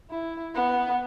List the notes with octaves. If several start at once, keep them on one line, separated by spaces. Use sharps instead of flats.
E4
B3